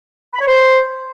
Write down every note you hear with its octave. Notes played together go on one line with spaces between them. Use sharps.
B5
C#5
C5